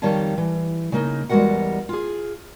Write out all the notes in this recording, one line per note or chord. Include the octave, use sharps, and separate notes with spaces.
F2 D#3 G3 C#5 F5 A5
E3
C#3 A#3 D#4
E2 G3 G#3 F#4 A#4 F#5
F4 G#4